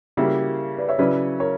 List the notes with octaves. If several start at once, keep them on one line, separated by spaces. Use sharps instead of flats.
C#3 G3 A#3 E4 F#4 A#4
B4 D5
C#5 E5
C#3 F#3 C#4 E4 B4 D5
A#4 C#5